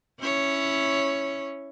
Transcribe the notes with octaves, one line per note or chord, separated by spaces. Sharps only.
C#4 E4 C#5